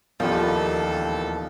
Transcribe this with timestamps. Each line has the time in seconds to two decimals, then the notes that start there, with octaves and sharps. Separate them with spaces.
0.20 D#1 E2 D#3 F3 G3 A4 A#4 F5